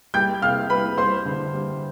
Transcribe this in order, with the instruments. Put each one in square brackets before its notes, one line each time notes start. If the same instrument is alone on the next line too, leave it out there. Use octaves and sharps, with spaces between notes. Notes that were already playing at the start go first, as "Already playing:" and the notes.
[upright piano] G3 G5 G6
C3 F5 F6
G3 B4 B5
G3 C5 C6
D3
G3